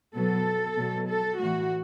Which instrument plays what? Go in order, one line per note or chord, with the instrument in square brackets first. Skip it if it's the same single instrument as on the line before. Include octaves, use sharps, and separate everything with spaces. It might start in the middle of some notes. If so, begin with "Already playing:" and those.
[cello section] B2 F#3 A4
B2 F#3
A4
A2 E3 F#4